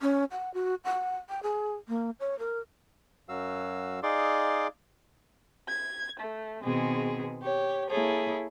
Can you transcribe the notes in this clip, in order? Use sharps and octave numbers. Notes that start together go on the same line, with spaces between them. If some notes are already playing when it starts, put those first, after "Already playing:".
C#4
F#5
F#4
F#5
G5
G#4
A#3
C#5
A#4
F#2 F#3 F#4 F5 E6
D#4 G#4 D5 F5 C6 D6
G#6
A3
B2 D#3 G#3 B3 C4 G#4
G4 C#5
A#3 E4 G#4 A4 C#5